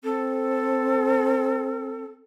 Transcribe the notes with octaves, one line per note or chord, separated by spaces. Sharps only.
C4 A4